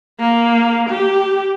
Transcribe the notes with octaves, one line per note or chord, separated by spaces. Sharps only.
A#3
G4